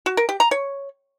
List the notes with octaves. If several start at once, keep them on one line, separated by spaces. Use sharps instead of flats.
F#4
A#4
G4
A#5
C#5